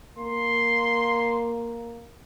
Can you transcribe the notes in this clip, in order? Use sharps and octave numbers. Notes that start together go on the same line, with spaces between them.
A#3 C6